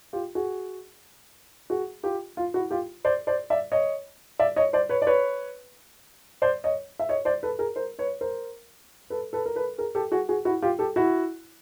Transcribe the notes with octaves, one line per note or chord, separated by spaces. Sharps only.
F4 G4
F#4 G#4
F#4 G#4
F4 G4
F4
E4 F#4
F4 G4
C5 D5
C5 D5
D5 E5
C#5 D#5
D5 E5
C#5 D#5
C5 D5
B4 C#5
D5
B4 C#5
C5 D5
C#5 D#5
E5
C#5 D#5
C5 D5
A4 B4
G#4 A#4
A#4 C5
B4 C#5
A#4 C5
A4 B4
A4 B4
A#4
A4 B4
G#4 A#4
G4 A4
F#4 G#4
F#4 G#4
E4 F#4
F4 G4
G4 A4
E4 F#4